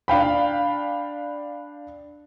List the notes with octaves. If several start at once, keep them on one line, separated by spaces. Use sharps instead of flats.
D4 F5 G5 B5